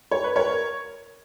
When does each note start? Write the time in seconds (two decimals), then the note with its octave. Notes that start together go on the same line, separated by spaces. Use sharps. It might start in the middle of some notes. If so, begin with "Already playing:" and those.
0.11 C#5
0.24 B4
0.36 A#4 C#5